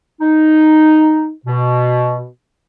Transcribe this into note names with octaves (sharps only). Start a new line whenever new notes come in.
D#4
B2